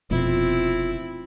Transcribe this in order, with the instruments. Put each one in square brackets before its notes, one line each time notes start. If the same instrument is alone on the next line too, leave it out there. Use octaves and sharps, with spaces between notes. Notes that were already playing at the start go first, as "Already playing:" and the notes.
[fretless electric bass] F1 F2 B2 [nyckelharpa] C4 E4 [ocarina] F4